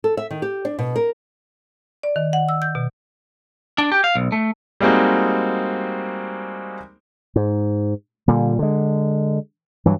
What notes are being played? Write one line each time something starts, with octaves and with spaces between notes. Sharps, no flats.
A4
E5
D#3
G4
D4
B2
A#4
D5
D#3
F#5
E6
G6
B2
D4
G4
F5
B1
A3
G3 G#3 A#3 C4 D#4 F#4
G#2
A#2 D3 G3
D3 G#3
G2 E3 F#3